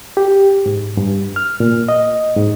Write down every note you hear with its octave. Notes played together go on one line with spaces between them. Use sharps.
G4
G#2
G2
F6
A#2
D#5
G#2